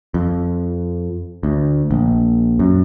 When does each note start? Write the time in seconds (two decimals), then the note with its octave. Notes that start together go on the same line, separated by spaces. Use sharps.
0.14 F2
1.43 D2
1.91 A#1
2.59 F#2